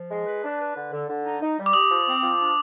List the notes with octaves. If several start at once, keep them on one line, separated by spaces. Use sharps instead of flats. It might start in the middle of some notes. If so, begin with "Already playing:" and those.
Already playing: F3
G#3
B4
D4
B4
D3
D3
D3
D#4
D#4
G3
D6
G4 D#6
F3
C4
F3
D4